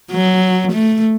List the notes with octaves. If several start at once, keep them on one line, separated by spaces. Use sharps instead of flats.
F#3
A3